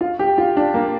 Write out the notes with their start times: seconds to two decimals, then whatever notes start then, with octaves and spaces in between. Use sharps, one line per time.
0.01 F4
0.19 G4
0.38 F4
0.57 D4
0.74 A#3